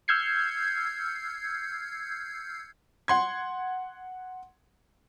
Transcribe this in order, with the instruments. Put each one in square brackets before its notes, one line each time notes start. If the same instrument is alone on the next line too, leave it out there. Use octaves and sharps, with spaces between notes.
[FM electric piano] E6 F6 G6 G#6 C7 C#7
[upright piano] F#5 C6 G#6